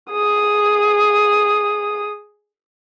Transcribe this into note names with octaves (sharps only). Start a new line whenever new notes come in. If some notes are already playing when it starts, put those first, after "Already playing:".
G#4 D#6